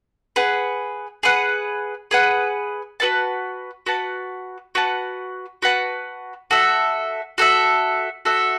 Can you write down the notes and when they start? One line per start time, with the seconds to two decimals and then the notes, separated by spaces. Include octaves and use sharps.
0.36 G#4 B4 F#5
1.23 G#4 B4 F#5
2.11 G#4 B4 F#5
3.00 F#4 B4 F#5 A5
3.86 F#4 B4 F#5 A5
4.75 F#4 B4 F#5 A5
5.62 F#4 B4 F#5 A5
6.51 F#4 A4 E5
7.38 F#4 A4 E5
8.25 F#4 A4 E5